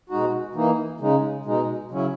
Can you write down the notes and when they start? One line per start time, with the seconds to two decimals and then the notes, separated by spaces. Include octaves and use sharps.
0.10 B2 G#3 D#4 F#4
0.55 E3 A#3 D#4
1.00 C#3 G#3 D#4
1.46 B2 G#3 D#4
1.91 C#3 F#3 C#4 E4